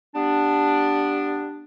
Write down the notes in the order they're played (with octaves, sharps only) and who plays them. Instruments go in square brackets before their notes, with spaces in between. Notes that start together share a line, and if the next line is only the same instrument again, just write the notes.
[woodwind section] G3 B3 D4